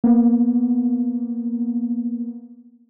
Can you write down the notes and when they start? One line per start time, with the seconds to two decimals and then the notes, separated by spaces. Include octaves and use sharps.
0.04 A#3 B3